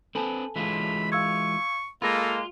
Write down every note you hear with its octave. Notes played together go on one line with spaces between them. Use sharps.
C4 A4 B4 G#5 A5
E3 G#3 F4 B5
F5 C#6 E6 G#6
G#3 A#3 F4 A4 B5 A#6